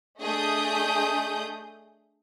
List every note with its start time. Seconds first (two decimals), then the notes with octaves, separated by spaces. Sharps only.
0.20 A3 D4 G#4 D#5 D#6 G6